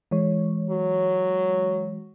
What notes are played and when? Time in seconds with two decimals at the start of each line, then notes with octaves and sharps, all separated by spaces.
0.11 E3 G#3 C#5
0.70 F#3